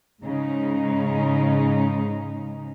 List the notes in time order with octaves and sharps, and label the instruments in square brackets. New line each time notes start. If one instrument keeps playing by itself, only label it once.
[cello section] G#2 C#3 G#3 D#4